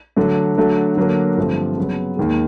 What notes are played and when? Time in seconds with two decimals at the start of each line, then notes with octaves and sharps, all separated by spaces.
0.17 D3 F#3 A3
0.57 D3 F#3 A3
0.97 D3 F#3 A#3
1.37 G2 D3 F3 A3 C4
1.78 C#3 F#3 B3
2.17 D#2 D#3 G#3